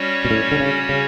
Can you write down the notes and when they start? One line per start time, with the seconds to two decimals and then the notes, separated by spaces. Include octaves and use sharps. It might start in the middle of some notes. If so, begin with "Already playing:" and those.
Already playing: G3 C#4 F#4 C#5
0.25 B2
0.31 A2
0.51 D3
0.60 C#3
0.89 C#3